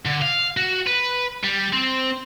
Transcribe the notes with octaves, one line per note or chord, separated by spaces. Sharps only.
D3
F5
F#4
B4
G3
C4